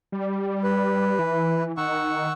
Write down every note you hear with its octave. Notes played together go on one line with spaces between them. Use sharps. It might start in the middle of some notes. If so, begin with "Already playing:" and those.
G3
B4
E3
D#3 F#5 C#6 E6